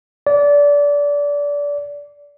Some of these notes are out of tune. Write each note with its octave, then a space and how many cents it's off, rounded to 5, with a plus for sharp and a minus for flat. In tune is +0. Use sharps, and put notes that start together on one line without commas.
D5 -25